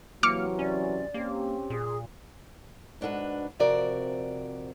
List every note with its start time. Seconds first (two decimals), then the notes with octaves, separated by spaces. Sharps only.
0.23 C3 E3 F#3 A#3 D6 F6 C#7
0.59 C#4 D5
1.14 A#3 C4 C#4 G4
1.70 A#2 G#4
3.01 G#2 D4 F#4 A4 B4
3.59 F2 C3 C4 F#4 A#4 D5